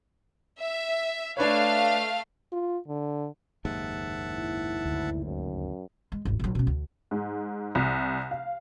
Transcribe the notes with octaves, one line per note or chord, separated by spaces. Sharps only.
E5
A3 D4 B4 C#5 F5
F4
D3
F#1 D#2 G#2 E5 F#5 A5
E4
D2
F#2
G#3
G#1 D2
A#1 F#3
B2 C#4
D2
G#2
C2
F5